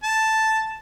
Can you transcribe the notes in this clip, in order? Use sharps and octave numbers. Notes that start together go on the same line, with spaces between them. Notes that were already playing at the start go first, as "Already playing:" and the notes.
A5